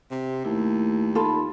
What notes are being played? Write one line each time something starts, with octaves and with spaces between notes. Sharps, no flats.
C3
D#2 A3 E4
D#4 F4 A4 A5 B5